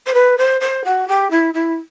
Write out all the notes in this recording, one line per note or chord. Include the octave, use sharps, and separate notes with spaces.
C5
B4
C5
C5
F#4
G4
E4
E4